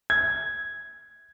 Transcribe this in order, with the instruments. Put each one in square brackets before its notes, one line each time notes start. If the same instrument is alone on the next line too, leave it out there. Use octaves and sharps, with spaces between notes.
[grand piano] G#6